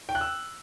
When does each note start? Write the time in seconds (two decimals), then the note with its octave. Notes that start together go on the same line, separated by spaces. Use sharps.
0.09 G5
0.15 F#6
0.21 E6